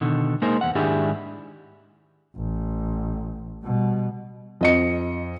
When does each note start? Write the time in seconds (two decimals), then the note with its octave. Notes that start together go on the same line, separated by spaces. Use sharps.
0.01 B2 D3 D#3
0.42 G#3 A#3 D#4 G#4 A#4 C5
0.61 E2 F#5
0.75 G#2 D#3 D4 E4 G4 G#4
2.36 A1
3.63 B2 G3
4.61 F2 D#5 C#7